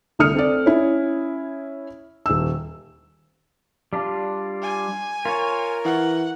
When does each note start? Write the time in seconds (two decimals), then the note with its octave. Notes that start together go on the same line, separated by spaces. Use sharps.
0.19 C2 D3 A3 D#6 F6 C#7
0.34 C4 A4 D5
0.66 C#4 E4
2.26 D#1 E6
3.93 G3 D4 F4
4.62 G#5
5.25 F4 A#4 C#5
5.85 E3 F#5